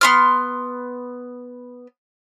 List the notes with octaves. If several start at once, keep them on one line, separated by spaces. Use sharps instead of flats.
B3 C6 F6